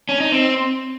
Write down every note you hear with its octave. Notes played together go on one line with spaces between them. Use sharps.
C#4
D#4
C4